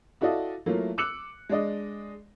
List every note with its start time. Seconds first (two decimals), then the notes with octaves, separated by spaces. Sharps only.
0.21 E4 F#4 A4 D5 D#5 F5
0.66 F#3 A3 A#3 E4 F4
0.98 D6 E6 F#6 C#7 F#7
1.49 G#3 D4 D5 D#5